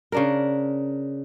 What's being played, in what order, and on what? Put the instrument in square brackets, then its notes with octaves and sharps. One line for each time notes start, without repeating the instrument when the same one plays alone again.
[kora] C#3 D4 A#4